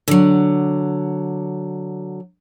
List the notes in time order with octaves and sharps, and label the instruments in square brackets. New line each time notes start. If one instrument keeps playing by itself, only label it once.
[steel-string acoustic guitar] D3 F#3